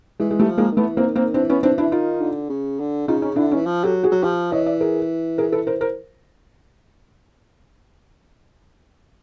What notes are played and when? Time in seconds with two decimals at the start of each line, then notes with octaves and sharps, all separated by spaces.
0.20 E3 G#3
0.31 G#3
0.40 G3 A3
0.48 F3
0.58 G#3 A#3
0.72 D#3
0.77 E3 A3 B3
0.97 A#3 C4
1.06 D#3
1.16 A#3 C4
1.34 E3 C4 D4
1.50 B3 C#4
1.63 E3 C4 D4
1.78 D4 E4
1.92 D#3 D#4 F4
2.21 D3
2.50 C#3
2.79 D3
3.08 C#3 D#4 F4
3.22 C#4 D#4
3.36 D3 D4 E4
3.51 C#4 D#4
3.55 E3
3.66 F3
3.84 F#3 G4 A4
4.03 F#4 G#4
4.12 F#3
4.23 F3 F4 G4
4.52 E3 C#5 D#5
4.66 D5 E5
4.81 G#4 A#4
5.38 G#4 A#4
5.52 A4 B4
5.67 A#4 C5
5.81 A#4 C5